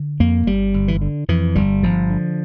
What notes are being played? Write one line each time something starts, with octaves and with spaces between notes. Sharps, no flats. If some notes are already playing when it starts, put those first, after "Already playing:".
Already playing: D3
F2 A#3
G1 G3
G1
E3
D3
F2 E3
G1 G3
G1 F3
D3